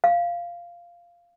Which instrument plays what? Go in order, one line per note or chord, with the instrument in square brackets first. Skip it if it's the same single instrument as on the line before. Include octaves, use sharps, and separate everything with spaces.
[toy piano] F5